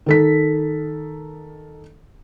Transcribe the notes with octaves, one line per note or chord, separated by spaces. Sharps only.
D#3 A4 B6